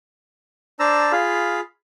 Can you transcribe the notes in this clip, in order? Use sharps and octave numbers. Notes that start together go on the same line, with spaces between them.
D4 C5 A5 A#5 E6
F4 G#4 F5 B5